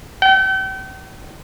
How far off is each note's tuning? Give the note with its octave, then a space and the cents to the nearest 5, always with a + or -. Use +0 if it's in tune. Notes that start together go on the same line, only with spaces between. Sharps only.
G5 -40